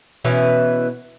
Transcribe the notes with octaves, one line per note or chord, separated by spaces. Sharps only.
B2 E3 C#4